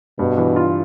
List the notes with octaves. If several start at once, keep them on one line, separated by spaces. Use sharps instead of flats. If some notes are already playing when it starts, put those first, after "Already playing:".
G2 B2
E3
F4